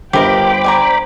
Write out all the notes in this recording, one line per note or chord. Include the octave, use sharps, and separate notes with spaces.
G1 G4 A#4 C5 D#5 G5 B5 D6
D5 G#5 A#5